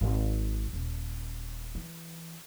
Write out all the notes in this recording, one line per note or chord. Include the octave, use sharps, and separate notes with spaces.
G#1
D#1
E3